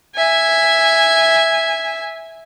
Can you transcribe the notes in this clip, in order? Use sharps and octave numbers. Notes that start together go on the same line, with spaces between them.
E5 G#5